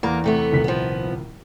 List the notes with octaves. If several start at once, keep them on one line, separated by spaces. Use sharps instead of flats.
E2 A#3 F#5 A#5
C3 A3 B3
D#1 C2 B6
F3 B3